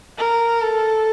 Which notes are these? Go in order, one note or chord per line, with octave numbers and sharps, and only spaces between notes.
A#4
A4